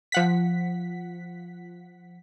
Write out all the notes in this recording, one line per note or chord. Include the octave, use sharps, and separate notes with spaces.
F3 F#5 B6